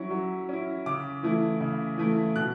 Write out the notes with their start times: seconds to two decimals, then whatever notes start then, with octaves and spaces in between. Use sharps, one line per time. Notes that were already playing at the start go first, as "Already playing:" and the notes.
Already playing: F#3 C#4 E4 C#6
0.11 F#3
0.49 C#4 E4
0.86 C#3 D6
1.23 E3 A3 E4
1.61 C#3
1.98 E3 A3 E4
2.36 B2 F#6